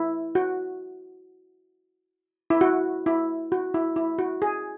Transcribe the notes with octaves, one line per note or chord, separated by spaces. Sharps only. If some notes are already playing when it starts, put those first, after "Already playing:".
Already playing: E4
F#4
E4
F#4
E4
F#4
E4
E4
F#4
G#4